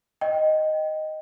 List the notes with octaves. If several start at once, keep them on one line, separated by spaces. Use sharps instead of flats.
D#5 G5